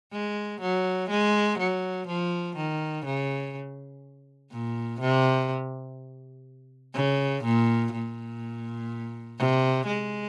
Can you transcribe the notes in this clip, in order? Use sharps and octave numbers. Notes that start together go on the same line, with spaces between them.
G#3
F#3
G#3
F#3
F3
D#3
C#3
A#2
C3
C#3
A#2
A#2
C3
G#3